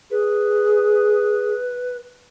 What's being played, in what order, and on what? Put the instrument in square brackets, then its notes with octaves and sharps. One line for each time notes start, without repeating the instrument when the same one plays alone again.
[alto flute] G#4 [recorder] B4